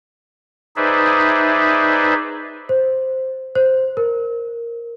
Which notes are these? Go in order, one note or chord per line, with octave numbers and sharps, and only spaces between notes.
D#4 G#4 B4 C5 D5 E5
C5
C5
A#4